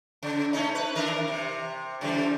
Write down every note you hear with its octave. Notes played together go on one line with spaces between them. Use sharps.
C#3
A3 C#4 D#4
B4
D#3 D4 A#4
C3
C#3 E3 G3